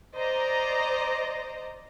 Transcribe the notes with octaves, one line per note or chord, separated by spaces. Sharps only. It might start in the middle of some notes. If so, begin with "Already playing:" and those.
C5 D5 D#5 A#5